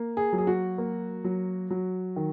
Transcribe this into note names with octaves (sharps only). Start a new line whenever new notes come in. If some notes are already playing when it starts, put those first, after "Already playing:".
Already playing: A#3
G#4
F#3
G#4
F#4
A#3
F#3
F#3
D#3